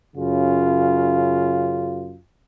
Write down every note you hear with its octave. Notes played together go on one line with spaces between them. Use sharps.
F#2 C#3 F4